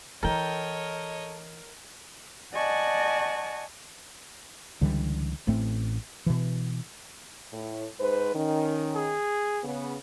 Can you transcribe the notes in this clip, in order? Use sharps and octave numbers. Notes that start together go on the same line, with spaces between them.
E3 E4 A4 A#4 C#5 D#5 G5
D5 D#5 F#5 G#5 A5 C#6
C#2 D3 E3 G3
A1 A2 A3 C4
B2 E3
A2
G#2 B4 C5
D#3 C#4
G#4
C#3 B3